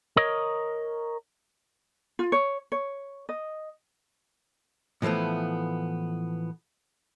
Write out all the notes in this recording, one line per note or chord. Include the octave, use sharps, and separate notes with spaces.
A#4 C#5 D#5
F4
C#5
C#5
D#5
A2 E3 F3 A3 B3